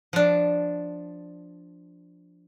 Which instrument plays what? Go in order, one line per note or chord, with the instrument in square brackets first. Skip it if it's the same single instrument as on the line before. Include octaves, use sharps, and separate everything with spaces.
[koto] F3 D4